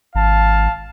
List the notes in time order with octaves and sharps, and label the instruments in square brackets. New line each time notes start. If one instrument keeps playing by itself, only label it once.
[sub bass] G#1 [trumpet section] F5 A5